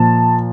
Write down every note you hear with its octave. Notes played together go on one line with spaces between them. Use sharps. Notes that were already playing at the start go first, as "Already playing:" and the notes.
Already playing: A#2 F3 A5